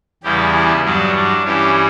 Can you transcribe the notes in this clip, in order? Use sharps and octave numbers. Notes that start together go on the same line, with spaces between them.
E2 C#3 E3 G3 G4
E4
G2 F#3 D4
D4
G2 E3 G3 C#4